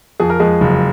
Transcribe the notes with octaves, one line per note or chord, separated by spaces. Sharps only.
F2 G#4
A#4
F2 G#3 G#4
F#1